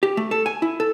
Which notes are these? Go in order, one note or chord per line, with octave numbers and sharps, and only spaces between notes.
G4
A3
A4
G#5
E4
A4